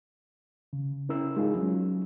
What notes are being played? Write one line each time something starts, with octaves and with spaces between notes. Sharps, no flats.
C#3
C#4 E4 A#4 E6
G#3 D#4 F4 G#4
F#3 C#4